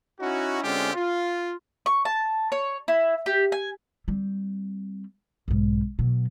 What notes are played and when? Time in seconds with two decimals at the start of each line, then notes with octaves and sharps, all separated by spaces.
0.20 C#4 D#4 E4 F#4
0.63 D3 G#3 C4 C#4 F4 G4
0.94 F4
1.86 C#6
2.05 A5
2.52 C#5
2.88 E4
3.26 G4
3.52 G#5
4.08 G3 C4
5.48 B1 G#2
5.99 B2 F#3